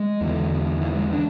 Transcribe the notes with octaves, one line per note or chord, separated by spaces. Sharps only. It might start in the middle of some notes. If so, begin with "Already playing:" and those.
Already playing: G#3
E2 D3
E3
G#3
D4